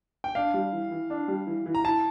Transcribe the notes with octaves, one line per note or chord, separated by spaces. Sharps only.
G5
D4 F5
G3
E3
E3
D4
G3
E3
E3
A#5
E4 A5